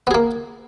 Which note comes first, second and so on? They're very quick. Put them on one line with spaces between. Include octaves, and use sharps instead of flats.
B3 G#4 A#3